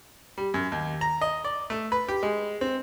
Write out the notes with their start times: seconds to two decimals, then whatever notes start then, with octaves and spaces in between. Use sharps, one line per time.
0.38 G3
0.54 F#2
0.72 D#2
1.01 A#5
1.21 D#5
1.44 D5
1.70 A3
1.92 B4
2.08 G4
2.23 G#3
2.61 C4